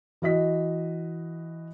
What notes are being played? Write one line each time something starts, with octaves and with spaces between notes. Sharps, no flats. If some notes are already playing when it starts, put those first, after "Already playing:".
E3 F#4 D#5 B6